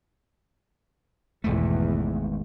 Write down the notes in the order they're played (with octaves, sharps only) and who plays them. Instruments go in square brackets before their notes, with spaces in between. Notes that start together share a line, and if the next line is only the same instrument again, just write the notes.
[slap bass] G#1 G#2 A3 [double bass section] E2 B2 E3